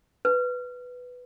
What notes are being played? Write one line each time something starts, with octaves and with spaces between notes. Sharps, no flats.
B4